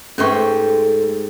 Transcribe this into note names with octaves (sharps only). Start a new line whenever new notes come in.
G#2 A3 C#4 G4 B4 C6 C#6